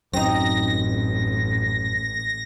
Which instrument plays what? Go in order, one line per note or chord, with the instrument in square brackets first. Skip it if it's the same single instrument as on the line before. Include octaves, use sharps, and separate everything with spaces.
[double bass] A1 [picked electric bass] F#2 [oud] C4 D#4 [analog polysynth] A#6